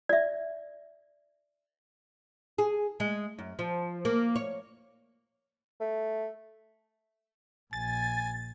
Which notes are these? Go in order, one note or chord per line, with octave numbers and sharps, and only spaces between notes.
D5 E5
G#4
G#3
F#2
F3
A#3
C#5
A3
A#1 G#5 A6